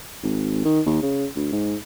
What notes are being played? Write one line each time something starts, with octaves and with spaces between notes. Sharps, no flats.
G#1
D#3
D#2
C#3
D2
G#2